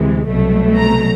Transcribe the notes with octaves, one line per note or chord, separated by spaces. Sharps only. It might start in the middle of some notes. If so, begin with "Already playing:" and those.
Already playing: D2 C3 E3 G#3
C2 B2 F#3 A3
A#5